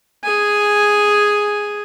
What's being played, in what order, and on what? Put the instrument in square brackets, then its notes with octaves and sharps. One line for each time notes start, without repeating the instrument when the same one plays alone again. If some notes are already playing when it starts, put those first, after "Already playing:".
[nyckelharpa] G#4 G#5